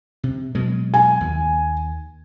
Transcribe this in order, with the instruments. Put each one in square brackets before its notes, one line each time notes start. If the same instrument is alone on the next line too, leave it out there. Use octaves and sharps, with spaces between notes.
[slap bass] C3
B2 F#3 G#3
[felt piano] G#5
[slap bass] D#2